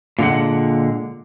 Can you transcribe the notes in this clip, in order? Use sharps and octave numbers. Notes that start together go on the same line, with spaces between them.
A#2 D3 G#3 F#5